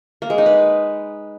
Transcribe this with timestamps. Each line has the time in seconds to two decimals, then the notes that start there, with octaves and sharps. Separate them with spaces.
0.22 A#3
0.30 G#3
0.38 D#4
0.46 B4